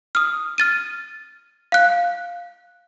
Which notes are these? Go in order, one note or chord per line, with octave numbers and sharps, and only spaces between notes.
D#6 F6
F6 A6 D#7
F5 F#6